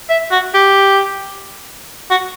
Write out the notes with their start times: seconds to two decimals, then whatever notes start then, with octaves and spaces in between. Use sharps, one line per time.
0.10 E5
0.31 F#4
0.54 G4
2.11 F#4